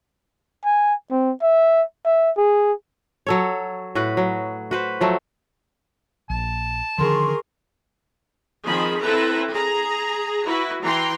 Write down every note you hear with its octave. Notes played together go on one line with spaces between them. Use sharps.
G#5
C4
E5
E5
G#4
F#3 A4 C#5
A2 F#4 B4
F#3
F#4 B4 C5
F3 F#3 A3
A#1 A5
D3 D#3 F3 G#4 A#4 C6 C#6
D#3 F3 C4 G#4 B5
C4 E4 A4 B4 A#5
G#4 A#5
E4 F#4 B4
E3 G5 A#5 C6